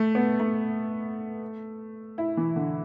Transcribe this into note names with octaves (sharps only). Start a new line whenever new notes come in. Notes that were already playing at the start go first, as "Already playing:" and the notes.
Already playing: A3
B3
A3
E4
E3
D3